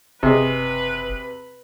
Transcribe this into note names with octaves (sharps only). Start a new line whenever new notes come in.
F#1 C3 G#4 B4 D#5